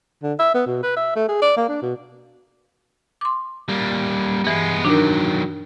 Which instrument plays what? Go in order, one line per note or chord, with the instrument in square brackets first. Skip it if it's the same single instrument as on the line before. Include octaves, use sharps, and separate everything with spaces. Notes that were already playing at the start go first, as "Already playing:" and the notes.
[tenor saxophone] D3
E5
B3
B2
B4
E5
A3
G#4
D5
A#3
D4
B2
[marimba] C6 D6
[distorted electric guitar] G3 A#3
[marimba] G2 E3 [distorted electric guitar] G#3 B3
[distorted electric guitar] D#3 F#3 [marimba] D4 D#4 A#4